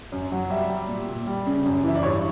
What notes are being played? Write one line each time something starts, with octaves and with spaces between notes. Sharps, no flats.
F#2
F#3
G3 E5
G3
A#2
A#2
G3
C#3
F#2
E3 E5
D5
G2 C#5